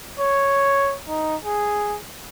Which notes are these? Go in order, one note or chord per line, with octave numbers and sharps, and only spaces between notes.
C#5
D#4
G#4